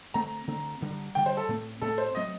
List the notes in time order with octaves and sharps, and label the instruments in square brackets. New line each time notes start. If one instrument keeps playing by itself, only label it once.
[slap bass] D3 A3 C4 [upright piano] A#5
[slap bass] D3 A3 C4
G2 D3 G3
[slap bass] G2 D3 G3 [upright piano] G5
[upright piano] C5
A4
[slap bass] A2 A3 C4
[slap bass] A2 A3 C4 [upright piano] A4
[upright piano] C5
[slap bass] F#3 A3 C4 [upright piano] D#5